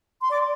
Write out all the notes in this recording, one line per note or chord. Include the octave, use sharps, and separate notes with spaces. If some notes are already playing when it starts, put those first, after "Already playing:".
C6
D5 D6